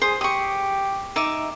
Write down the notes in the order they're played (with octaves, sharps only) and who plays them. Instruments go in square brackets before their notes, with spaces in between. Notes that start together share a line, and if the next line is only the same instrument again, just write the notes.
[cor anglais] G#4 [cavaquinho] C5
[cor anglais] G4 [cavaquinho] C#6 D#6
[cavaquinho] D#4 E5 D6